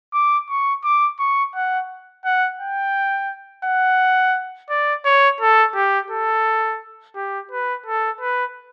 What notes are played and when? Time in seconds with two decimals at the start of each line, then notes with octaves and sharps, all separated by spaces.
0.14 D6
0.50 C#6
0.84 D6
1.19 C#6
1.55 F#5
2.25 F#5
2.60 G5
3.65 F#5
4.70 D5
5.05 C#5
5.41 A4
5.75 G4
6.11 A4
7.16 G4
7.51 B4
7.86 A4
8.21 B4